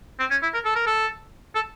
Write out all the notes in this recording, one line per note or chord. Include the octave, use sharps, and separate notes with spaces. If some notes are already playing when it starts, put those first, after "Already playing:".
C4
C#4
E4
A#4
A4
A#4
A4
A4